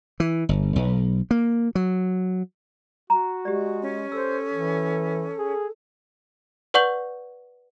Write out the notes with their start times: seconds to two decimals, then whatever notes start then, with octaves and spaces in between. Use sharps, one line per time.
0.20 E3
0.49 G1
0.76 B1
1.31 A#3
1.75 F#3
3.10 F#4 A#5
3.45 G#3 G4 D5
3.82 C#4
4.12 A4 C5 E6
4.54 E3
5.38 G#4
6.74 B4 D5 F#5 C#6 G6 F#7